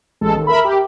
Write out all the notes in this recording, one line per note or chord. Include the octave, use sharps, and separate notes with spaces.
A1 G#3 A4
D#2
A#4 E5 B5
G4